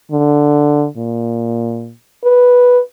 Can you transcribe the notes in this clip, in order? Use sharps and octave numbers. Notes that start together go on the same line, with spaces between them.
D3
A#2
B4